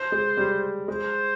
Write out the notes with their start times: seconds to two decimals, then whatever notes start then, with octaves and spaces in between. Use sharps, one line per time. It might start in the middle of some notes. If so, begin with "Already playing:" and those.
Already playing: C5
0.12 G#3
0.37 G3
0.88 G#3 C5